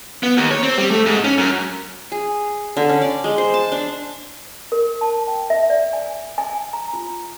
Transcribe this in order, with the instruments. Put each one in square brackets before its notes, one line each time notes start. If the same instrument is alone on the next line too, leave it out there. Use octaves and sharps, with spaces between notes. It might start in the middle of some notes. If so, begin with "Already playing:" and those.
[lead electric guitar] B3
D#2
C#5
C4
G3
A3
G#2
C#4
F#2
[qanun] G#4
D3
C#4
D5
G#3
C5
A5
D4
[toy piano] A#4
A5
G5
E5
D5
G#5
G#5
A#5
F4